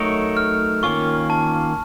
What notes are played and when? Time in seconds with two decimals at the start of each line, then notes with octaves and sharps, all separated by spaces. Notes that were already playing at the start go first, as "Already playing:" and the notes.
Already playing: F#3 A3 D#4 A#4 C#5
0.37 F6
0.83 D#3 A#3 C#4 F4 C#6
1.30 A5